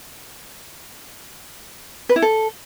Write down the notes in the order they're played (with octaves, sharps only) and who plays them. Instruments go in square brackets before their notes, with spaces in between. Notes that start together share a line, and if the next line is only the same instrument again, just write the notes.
[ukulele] B4
E4
A4